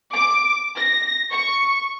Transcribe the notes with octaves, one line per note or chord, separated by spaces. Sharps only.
D6
A#6
C#6